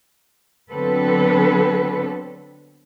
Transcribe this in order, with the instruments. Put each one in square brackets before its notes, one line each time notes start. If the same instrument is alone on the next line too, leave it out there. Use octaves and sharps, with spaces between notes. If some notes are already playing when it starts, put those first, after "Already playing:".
[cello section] D3 F#3 B3 C4 A4 B4